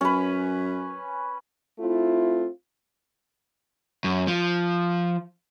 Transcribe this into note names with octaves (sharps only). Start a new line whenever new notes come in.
F#2 C#4 B4
A3 C4 E4 F4
F#2
F3